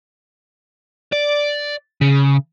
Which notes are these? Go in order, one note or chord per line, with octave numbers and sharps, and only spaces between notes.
D5
C#3